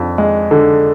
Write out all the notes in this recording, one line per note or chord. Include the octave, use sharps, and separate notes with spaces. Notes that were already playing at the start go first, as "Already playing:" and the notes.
Already playing: F2 D4
G#3
D3